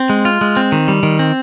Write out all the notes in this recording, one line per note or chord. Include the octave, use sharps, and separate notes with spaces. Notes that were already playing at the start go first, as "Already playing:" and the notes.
Already playing: C4
G#3
F4
G#3
C4
D#3
G3
D#3
C4